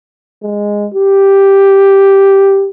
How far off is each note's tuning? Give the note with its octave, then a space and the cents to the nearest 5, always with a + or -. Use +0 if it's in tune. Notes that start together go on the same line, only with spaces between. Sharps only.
G#3 -10
G4 +0